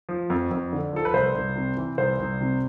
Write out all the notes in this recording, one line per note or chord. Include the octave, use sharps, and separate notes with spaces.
F3
F2
F2
D3
F3 A4
B4
C2 C5
C2
C3
E3
C2 C5
C2
C3